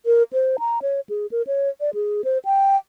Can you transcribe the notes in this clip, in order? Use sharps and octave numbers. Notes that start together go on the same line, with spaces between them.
A#4
C5
A#5
C#5
G#4
A#4
C#5
D5
G#4
C5
G5